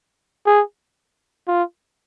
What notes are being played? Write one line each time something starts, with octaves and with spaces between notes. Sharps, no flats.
G#4
F4